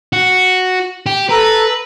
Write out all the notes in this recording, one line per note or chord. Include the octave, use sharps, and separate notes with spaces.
F#4
G4
A4 B4 A#5 E6